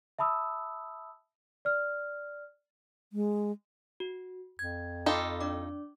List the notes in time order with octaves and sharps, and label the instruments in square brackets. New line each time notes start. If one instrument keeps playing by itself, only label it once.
[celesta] E5 A5 B5 D#6 E6
D5 F6
[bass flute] G#3
[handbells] F#4
[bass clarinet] F2 [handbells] G#6
[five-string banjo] D#4 F4 A4 [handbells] G5 B5 D6
[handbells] D4 D5 D6